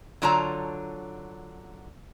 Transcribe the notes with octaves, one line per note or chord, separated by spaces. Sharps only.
D3 F#3 F4 C#5 A5 A#5